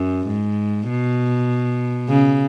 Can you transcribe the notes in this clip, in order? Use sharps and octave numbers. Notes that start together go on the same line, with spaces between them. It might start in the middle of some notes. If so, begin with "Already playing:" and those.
Already playing: F#2
G#2
B2
C#3